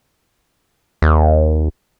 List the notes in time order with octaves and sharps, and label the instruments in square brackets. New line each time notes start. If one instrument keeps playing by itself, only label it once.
[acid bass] D#2